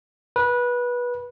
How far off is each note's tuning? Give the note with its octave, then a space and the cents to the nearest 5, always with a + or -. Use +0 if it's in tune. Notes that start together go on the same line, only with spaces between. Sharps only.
B4 -20